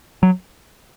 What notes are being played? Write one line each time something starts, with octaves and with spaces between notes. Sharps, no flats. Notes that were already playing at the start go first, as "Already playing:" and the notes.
F#3